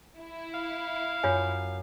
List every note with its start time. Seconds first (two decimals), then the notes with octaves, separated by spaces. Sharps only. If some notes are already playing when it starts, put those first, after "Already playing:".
0.17 E4
0.54 F5
1.23 F#2 F4 C#5 G#5